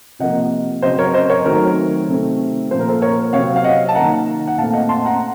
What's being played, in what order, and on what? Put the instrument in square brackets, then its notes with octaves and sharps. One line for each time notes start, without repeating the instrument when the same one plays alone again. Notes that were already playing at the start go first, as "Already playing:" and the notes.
[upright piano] C3 F3 A#3 D#5 F#5
C#3 F#3 C4 C5 D#5
A#4 C#5
C5 D#5
A#4 C#5
D#3 F#3 A3 C4 A#4
C3 D#3 A3 C4
A#2 F3 A#3 C5
A#4
A4 C5
A#4 C#5
C3 F#3 C4 C#5 F5
F5
D#5 F#5
A5
D#3 A#3 F#5 A#5
F#5
A#2 A3 C4 F5 A5
D#5 F#5
A5 C6
F#5 A#5